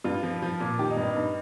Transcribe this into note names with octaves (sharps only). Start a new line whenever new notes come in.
G2 F4
F3
F3
A#2
D#3 G4
D#4
G2
D#4
G2